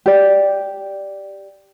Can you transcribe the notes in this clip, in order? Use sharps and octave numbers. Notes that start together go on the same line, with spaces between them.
G4 D5